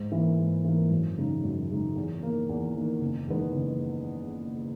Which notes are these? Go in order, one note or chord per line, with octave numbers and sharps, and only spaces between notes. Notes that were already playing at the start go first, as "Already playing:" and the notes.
Already playing: G#2
E3 A#3
G#2
E3 A#3
F#2
C#3 G#3 D#4
F#2
C#3 G#3 D#4
E2
D#3 A#3
E2
D#3 A#3
F#1
E2 D#3 G#3 B3
F#1